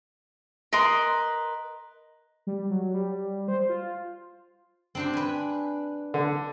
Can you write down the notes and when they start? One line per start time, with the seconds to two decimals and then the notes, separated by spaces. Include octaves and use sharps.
0.73 A#4 B4 D#5 C6
2.47 G3
2.70 F#3
2.94 G3
3.48 C5
3.69 F4
4.95 C4 D4 G4
5.13 B4 G#5
6.14 D3